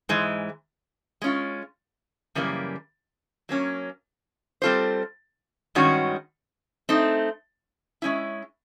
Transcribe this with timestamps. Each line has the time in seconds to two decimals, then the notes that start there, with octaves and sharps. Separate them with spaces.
0.09 G#2 E3 G#3
1.22 G#3 C#4 F4
2.35 F#2 C#3 E3 G3 A#3
3.49 F#3 A#3 C#4
4.62 G3 C4 F4 A4 C5
5.75 G2 D#3 G#3 C#4 F#4
6.89 A3 C4 D#4
8.02 G#3 C#4 E4